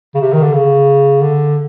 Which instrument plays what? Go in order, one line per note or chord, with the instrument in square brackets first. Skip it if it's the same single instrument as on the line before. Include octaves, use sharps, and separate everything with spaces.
[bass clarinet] C#3
C3
D#3
D3
C#3
D3